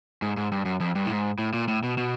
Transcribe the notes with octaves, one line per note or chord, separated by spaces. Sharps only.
G#2
G#2
G2
F#2
F2
G2
A2
G#2
A2
A#2
A2
B2
B2